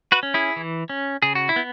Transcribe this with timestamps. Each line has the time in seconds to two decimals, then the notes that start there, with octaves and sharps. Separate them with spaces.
0.12 F#4 B4
0.23 C#4
0.34 E4 G#4
0.56 E3
0.89 C#4
1.22 C#3 G#4
1.35 F#4
1.49 E4
1.56 B3